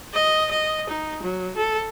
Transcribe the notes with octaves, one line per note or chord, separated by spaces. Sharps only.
D#5
D#5
D#4
F#3
A4